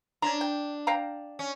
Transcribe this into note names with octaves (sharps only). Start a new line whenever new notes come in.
C#4 D4 A#5
G5
F5 G5 A#5
C#4